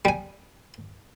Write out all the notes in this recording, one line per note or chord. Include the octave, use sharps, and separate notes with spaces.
G3 G#5